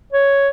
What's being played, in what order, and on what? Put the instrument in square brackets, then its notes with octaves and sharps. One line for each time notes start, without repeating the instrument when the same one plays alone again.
[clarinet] C#5